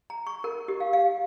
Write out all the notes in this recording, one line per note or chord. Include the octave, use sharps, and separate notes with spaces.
A#5
C#6
A#4
G4
F5
F5